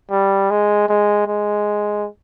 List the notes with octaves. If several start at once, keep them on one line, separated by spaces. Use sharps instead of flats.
G3
G#3
G#3
G#3